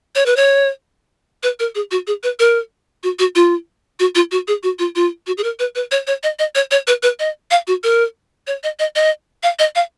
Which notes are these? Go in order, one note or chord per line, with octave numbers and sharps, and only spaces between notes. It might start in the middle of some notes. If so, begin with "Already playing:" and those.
C#5
B4
C#5
B4
A#4
G#4
F#4
G#4
B4
A#4
F#4
F#4
F4
F#4
F4
F#4
G#4
F#4
F4
F4
F#4
G#4
A#4
B4
B4
C#5
C#5
D#5
D#5
C#5
C#5
B4
B4
D#5
F5
F#4
A#4
C#5
D#5
D#5
D#5
F5
D#5
F5